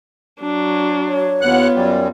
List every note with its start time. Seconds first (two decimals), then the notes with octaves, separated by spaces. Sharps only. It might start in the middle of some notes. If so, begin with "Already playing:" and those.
0.40 F#3 D4
1.09 C#5
1.41 D#2 B3 F4 F#5 F#6
1.75 F#2 G3